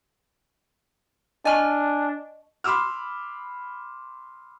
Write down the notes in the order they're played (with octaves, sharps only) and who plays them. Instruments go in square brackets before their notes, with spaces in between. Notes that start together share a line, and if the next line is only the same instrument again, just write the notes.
[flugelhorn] D4 [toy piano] D#5 A5 C#6 [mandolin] G#5 F6
[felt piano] B5 C6 D6 E6 F6